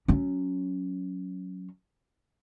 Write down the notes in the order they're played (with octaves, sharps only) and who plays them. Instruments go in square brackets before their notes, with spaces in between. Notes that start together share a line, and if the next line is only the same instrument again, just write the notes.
[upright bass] F#3 C#4